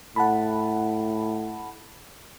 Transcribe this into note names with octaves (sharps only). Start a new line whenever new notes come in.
A2 F#5 A5 B5